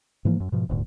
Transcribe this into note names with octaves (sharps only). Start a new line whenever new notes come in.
G#2 E3 F3 A#3
F#2
G#2 B2 F3
D#1 D2 G#2